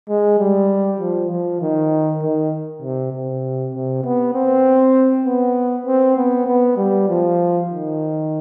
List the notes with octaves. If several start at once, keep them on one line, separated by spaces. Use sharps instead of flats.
G#3
G3
F3
F3
D#3
D#3
C3
C3
C3
B3
C4
B3
C4
B3
B3
G3
F3
D#3